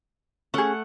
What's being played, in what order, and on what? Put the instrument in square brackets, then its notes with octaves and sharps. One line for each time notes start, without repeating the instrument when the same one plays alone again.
[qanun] A3 F#5 [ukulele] C#4 G#4